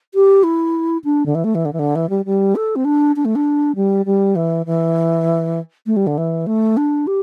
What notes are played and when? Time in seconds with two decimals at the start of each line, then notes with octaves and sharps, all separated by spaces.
0.14 G4
0.43 E4
1.04 D4
1.26 D3
1.35 E3
1.44 A3
1.55 E3
1.65 D3
1.73 E3
1.79 D3
1.95 E3
2.09 G3
2.25 G3
2.55 A4
2.76 C4
2.85 D4
3.16 D4
3.25 A3
3.35 D4
3.76 G3
4.06 G3
4.36 E3
4.66 E3
5.86 A3
5.96 G3
6.07 D3
6.18 E3
6.47 A3
6.77 D4
7.07 G4